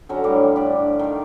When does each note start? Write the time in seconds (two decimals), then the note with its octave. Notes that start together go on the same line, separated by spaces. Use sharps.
0.09 D3 F#3 C#4 A#5
0.24 A2 G3 F5 D6
0.56 D4 G4 D5 G5
0.99 D#3 A#4